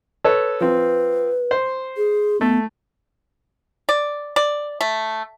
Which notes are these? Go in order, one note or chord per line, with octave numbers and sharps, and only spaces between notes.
A4 B4 C#5
F3 C4 B4
C5
G#4
A3 B3
D5
D5
A3